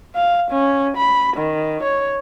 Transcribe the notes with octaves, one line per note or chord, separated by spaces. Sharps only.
F5
C#4
B5
D#3
C#5